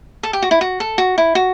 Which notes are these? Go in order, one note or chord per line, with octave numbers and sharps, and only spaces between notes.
A4
G4
F#4
E4
F#4
A4
F#4
E4
F#4